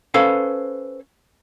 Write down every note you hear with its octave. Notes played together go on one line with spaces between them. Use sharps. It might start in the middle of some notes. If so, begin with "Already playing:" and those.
C#4 A4 B4 C5 F5